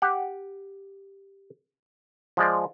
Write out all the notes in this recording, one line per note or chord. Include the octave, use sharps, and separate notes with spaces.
G4 F#5
F3 G#3 D5